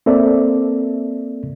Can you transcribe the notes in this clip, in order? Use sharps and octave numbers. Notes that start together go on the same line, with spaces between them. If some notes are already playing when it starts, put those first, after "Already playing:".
A#3 C4 A4 D5 E5